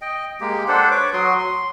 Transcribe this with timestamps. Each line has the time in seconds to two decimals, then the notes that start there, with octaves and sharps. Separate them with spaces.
0.02 D#5 G5
0.41 G#3 A#3 G4
0.68 D4 A4 C5 F#5
0.91 B4 C#5 D6
1.13 F#3 F#4 C6 D#6
1.39 C6